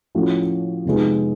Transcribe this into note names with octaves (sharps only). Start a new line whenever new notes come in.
A2 F3 A3 C#4 F#4
F2 C3 D#3 G#3 B3